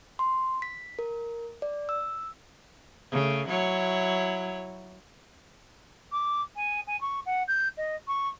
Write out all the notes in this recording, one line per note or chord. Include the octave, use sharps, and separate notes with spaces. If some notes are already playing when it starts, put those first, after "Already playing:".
C6
B6
A#4
D5
E6
C#3 A3
F#3 E4 C#5
D6
G#5
G#5
C#6
F#5
G6
D#5
C#6